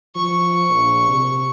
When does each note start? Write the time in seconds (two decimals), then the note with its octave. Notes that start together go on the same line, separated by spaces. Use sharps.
0.15 F3 C#6
0.70 A#1
1.08 C3